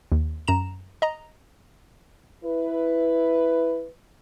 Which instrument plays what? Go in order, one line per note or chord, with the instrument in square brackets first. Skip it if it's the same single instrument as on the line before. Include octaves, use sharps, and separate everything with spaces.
[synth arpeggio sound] D#2
F#2 A#5 E7
D#5 A#5
[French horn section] E4 B4